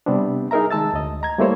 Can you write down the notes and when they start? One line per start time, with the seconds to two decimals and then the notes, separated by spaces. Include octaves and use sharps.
0.06 C3 G3 B3 C4 D4
0.51 D#4 G#4 A#4 E5 A#5
0.71 D#3 G#3 A5 E6 A6
0.93 D2 D#5
1.23 A#5 G#6
1.38 G3 A3 A#3 E4 C5 C#5